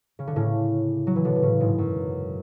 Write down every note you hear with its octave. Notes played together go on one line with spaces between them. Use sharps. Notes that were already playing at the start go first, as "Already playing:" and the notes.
C#3
D3
A2 C#3
F#3
E3
B2 D3
D3
A2 C#3
G#2 B2
F#2